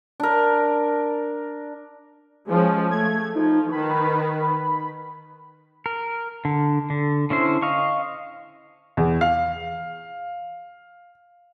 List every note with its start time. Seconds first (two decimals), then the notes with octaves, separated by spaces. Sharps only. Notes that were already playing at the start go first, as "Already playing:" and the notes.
0.20 D4 A#4
2.50 F3 G#3 C#4
2.91 A3 G#6
3.35 F3 D#4
3.72 D#3 B4 B5
5.86 A#4
6.45 D3
6.90 D3
7.30 D3 C#4 E4 C5
7.62 D#5 F5 C#6
8.97 E2
9.21 F5